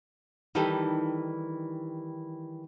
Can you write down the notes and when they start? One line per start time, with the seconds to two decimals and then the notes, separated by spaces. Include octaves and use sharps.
0.55 D#3 E3 G3 D#4 G4 A4